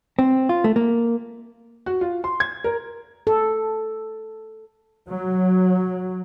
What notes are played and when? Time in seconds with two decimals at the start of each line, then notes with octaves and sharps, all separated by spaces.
0.19 C4
0.49 F4
0.64 A3
0.76 A#3
1.86 F#4
2.01 F4
2.24 C6
2.40 G#6
2.64 A#4
3.27 A4
5.09 F#3